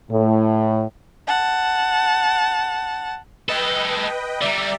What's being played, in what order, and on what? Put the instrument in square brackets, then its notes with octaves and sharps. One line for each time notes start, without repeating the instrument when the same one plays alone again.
[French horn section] A2
[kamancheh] F#5 A5
[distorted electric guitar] G#3 A4 [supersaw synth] B4 D#5 G5
[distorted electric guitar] D3 G3 [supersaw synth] D5 E5 A#5